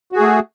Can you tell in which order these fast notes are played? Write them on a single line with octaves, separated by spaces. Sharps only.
F#4 G#4 A3